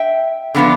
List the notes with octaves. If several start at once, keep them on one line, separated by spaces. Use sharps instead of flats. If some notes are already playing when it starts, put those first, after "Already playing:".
Already playing: E5 G5
D3 F3 B3 D4